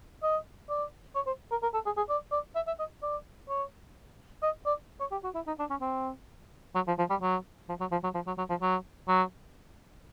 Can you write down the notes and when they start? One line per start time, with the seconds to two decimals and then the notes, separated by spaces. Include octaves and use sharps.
0.23 D#5
0.70 D5
1.15 C#5
1.27 C5
1.51 A#4
1.63 A#4
1.74 A4
1.86 G#4
1.97 G#4
2.10 D5
2.32 D5
2.55 E5
2.67 E5
2.79 D#5
3.02 D5
3.49 C#5
4.43 D#5
4.66 D5
5.00 C#5
5.12 G4
5.24 F#4
5.35 E4
5.47 D#4
5.59 D4
5.70 C#4
5.82 C4
6.75 F#3
6.88 F3
6.98 F3
7.10 G3
7.22 F#3
7.69 F3
7.80 F#3
7.92 F3
8.04 F#3
8.15 F3
8.27 F#3
8.38 F#3
8.50 F3
8.62 F#3
9.08 F#3